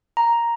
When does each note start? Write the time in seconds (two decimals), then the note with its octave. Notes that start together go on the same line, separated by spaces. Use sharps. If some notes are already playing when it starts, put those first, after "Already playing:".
0.17 A#5